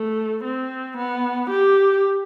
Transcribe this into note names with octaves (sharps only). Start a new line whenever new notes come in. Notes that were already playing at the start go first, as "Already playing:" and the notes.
Already playing: A3
C4
B3
G4